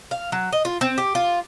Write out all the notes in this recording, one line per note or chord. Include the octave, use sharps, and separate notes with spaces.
F5
F#3
D#5
F4
C4
G4
F4